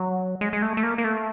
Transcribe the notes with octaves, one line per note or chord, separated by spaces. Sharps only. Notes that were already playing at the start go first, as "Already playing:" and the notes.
Already playing: F#3
G#3
G#3
A3
A3
A#3
A#3
A3